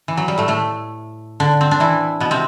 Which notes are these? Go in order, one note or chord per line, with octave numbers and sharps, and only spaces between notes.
E3
F#3
G3
A2 A3
A2 A3
D3 D4
C4
D4
E3 E4
B2 B3
C3 C4